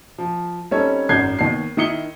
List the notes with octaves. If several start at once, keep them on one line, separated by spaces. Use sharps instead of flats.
F3
G3 C4 C#4 D#4 A4 C#5
G#1 F#2 G6 G#6 C7
D#2 B3 C7
D#3 E4 D#6 C#7 G7